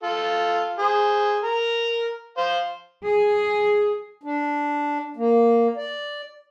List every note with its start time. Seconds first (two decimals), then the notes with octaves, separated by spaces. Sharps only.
0.03 F4 A4
0.79 G#4 C5
1.44 A#4 A#5
2.37 C5 F5
3.03 G#4
4.23 D4
5.17 A#3
5.77 D5